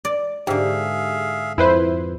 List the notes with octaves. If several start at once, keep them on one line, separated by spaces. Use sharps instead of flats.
D5
G#2 D3 G4 G#4 E5 F5
F2 E4 B4 C5